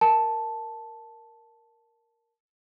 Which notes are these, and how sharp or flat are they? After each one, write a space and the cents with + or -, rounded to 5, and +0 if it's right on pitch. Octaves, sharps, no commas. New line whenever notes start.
A#4 +0 A5 -5